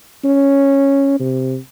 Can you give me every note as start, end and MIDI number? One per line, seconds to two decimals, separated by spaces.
0.24 1.16 61
1.20 1.56 48